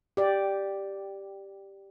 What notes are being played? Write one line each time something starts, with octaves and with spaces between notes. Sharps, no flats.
G4 D5